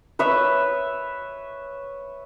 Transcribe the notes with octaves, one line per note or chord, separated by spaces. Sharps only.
B4 C#5 E5